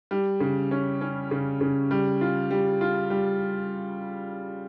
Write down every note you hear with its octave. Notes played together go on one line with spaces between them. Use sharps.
G3
C#3
C#4
C#4
C#3
C#3
G3
F4
G3
F4
G3